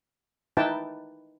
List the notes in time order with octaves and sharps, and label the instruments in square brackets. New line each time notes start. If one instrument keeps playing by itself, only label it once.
[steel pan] D#4 E4 B4 G5 A5